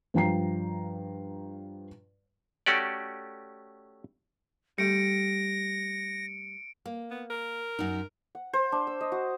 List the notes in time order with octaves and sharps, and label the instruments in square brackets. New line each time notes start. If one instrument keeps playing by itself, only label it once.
[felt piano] G2 F3 G5 A#5 C7
[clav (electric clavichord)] A3 C#4 F#4 G4 D5
[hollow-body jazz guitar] G3 A3 [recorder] A#6 [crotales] C#7 D7
[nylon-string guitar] A#3
[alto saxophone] B3
A#4
[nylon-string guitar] F#2 D#4
[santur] F#5
C5
D4
E6
D#5
F#4